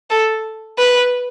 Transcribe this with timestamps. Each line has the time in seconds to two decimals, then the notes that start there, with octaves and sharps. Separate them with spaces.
0.10 A4
0.79 B4